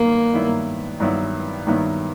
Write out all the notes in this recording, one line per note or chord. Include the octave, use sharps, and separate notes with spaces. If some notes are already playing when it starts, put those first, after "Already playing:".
Already playing: G2 D#3 F#3 A#3 B3 E4
G2 D#3 F#3 B3 E4
G2 D#3 F#3 B3 E4
G2 D#3 F#3 B3 E4